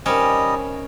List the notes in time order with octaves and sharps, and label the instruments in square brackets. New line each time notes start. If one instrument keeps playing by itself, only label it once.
[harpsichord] D#3 C4 [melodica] G3 D#5 [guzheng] C#4